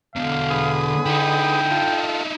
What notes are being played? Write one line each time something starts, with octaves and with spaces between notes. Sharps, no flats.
E2 B2 D3 F5
G#4 B4 D#6
D#4 E4 G5
F4 A4